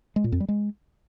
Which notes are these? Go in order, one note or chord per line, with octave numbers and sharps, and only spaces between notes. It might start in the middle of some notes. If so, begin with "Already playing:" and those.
G#3
A#2
F2
G3
G#3